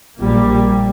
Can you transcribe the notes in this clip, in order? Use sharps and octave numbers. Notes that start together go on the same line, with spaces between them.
A#1 A#2 G3 A#3